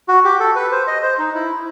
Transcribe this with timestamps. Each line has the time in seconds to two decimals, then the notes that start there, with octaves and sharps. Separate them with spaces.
0.08 F#4
0.24 G4
0.40 A4
0.56 B4
0.72 C5
0.87 D#5
1.03 C5
1.19 D#4
1.35 E4